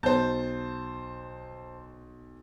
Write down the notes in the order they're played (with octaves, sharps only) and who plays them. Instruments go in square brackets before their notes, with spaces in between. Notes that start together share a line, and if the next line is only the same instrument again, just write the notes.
[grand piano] B1 G6 [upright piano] C5 A5